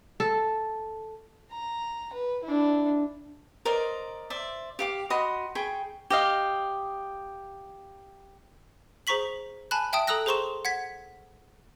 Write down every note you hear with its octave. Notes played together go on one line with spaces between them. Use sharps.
A4
A#5
B4
D4 E4
A#4 C5 D5 D#5
C5 D5 E5
G4 F5 D6
F#4 D#5 B5 C6
G#4 G5 B5 C#6
G4 D#5 F5
G#4 C5 A#5 C#6 B6 F#7
G#5 A5 B5 F#6
E5 G5 A5 D#6 D7
A4 A#5 D#6 E6 F#6 A#6
G#4 C5 A#5 C6 C#6 E7
F#5 G#6 B6